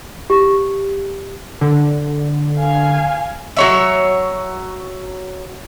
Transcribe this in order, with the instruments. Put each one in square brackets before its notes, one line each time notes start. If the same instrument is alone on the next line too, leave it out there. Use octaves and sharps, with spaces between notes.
[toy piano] G4
[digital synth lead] D3
[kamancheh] F5 G#5
[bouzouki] F#3 C#5 E5